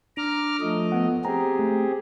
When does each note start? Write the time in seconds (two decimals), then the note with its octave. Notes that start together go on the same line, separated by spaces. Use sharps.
0.17 D4 A#5 D6 F6
0.61 F3 A3 D#5
0.92 B3 F#5
1.25 C4 G4 G#4 A#5
1.59 A3